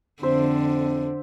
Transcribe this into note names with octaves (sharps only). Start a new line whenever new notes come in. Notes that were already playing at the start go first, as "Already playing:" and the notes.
F2 D3 C4 C5 E5